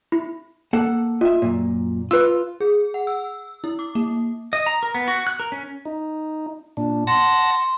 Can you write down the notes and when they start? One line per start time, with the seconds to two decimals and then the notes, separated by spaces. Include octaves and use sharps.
0.12 E4
0.73 A#3 A4 F#5
1.21 F4 D#5 E5
1.42 F#2 A#2
2.11 F4 B4 E6
2.60 G#4
2.94 F#5
3.07 E6
3.64 E4
3.79 D6
3.95 A#3
4.53 D#5
4.66 A#5
4.83 A#4
4.95 B3
5.08 F#4
5.27 F#6
5.40 A#4
5.52 C#4
5.85 D#4
6.77 A#2 D4
7.07 F#5 A5 C6 A#6